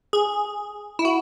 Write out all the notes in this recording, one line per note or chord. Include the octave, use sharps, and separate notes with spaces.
G#4
E4
F#4